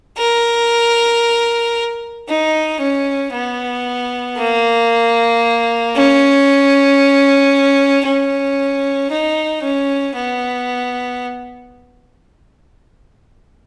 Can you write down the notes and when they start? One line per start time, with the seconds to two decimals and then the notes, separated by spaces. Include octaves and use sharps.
0.18 A#4
2.28 D#4
2.80 C#4
3.33 B3
4.38 A#3
5.96 C#4
8.05 C#4
9.11 D#4
9.63 C#4
10.15 B3